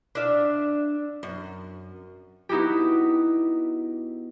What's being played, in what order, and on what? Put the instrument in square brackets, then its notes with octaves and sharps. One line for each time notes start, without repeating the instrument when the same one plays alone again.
[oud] D4 E5 F5
F#2
[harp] B3 D#4 E4 F#4 G4